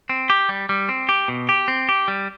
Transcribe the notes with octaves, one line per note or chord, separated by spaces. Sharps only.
C4
G4
G3
G3
C4
G4
B2
G4
C4
G4
G3